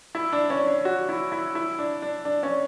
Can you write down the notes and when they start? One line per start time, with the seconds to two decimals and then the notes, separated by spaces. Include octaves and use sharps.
0.15 E4
0.32 D4
0.50 C#4
0.67 D4
0.85 F#4
1.09 E4
1.32 E4
1.55 E4
1.79 D4
2.02 D4
2.25 D4
2.43 C#4